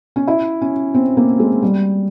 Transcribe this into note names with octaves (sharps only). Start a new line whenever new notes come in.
C#4
E4
C#4
C4
A#3
G#3
G3